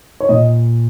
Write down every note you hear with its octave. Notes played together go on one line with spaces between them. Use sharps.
C#5
A#2 D#5